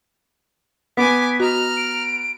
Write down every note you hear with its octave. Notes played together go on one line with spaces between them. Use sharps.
B3 G#5 D6 B6
F#4 D#5 A#5 F6
D7